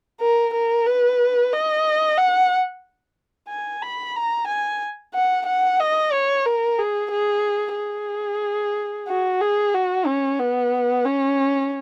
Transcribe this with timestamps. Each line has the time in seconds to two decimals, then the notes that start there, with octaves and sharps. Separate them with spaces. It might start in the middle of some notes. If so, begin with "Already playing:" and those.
0.21 A#4
0.54 A#4
0.86 B4
1.53 D#5
2.18 F#5
3.49 G#5
3.82 B5
4.16 A#5
4.48 G#5
5.14 F#5
5.46 F#5
5.80 D#5
6.12 C#5
6.46 A#4
6.79 G#4
7.11 G#4
7.77 G#4
9.08 F#4
9.41 G#4
9.75 F#4
10.06 C#4
10.40 B3
11.06 C#4